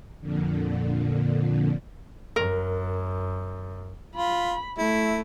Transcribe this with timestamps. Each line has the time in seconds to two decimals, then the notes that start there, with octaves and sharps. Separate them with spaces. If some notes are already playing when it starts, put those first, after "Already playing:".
0.21 F2 A#2 D3
2.36 F#2 A#4
4.16 F4 B5
4.78 A3 E4